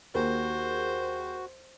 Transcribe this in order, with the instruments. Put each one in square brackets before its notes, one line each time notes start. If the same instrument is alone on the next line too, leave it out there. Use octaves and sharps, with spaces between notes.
[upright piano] D#2 [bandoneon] F#4 [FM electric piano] G#4 A#4 [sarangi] C5